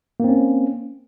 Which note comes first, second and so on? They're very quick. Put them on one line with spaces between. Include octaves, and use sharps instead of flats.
A#3 C4 C#4